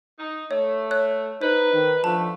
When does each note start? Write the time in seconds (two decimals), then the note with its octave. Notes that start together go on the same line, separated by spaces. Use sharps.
0.19 D#4
0.51 A3 C#5
0.91 C#5 F#6
1.41 D#4 B4 C5
1.74 D#3
2.04 D3 F3 A3 A5